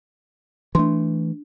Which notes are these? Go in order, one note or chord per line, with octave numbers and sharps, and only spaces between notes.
E3 A3 D4 C6